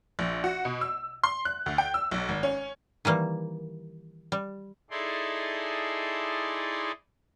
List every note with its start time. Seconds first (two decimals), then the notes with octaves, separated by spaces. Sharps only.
0.19 A#1
0.44 F#4
0.65 B2
0.81 E6
1.24 C6
1.45 F#6
1.66 D2
1.78 G5
1.94 E6
2.11 B1
2.29 G#1
2.43 C#4
3.05 D#3 E3 G3 A#3
4.32 G3
4.91 D#4 E4 G#4 A4 D5 C6